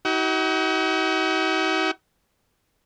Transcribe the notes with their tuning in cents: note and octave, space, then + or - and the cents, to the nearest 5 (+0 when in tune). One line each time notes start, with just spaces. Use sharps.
D#4 +45 F#4 +40